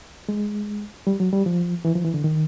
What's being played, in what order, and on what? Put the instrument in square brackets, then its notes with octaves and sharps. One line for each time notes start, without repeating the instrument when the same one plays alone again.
[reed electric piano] G#3
G3
F#3
G3
F3
E3
F3
E3
D3
D#3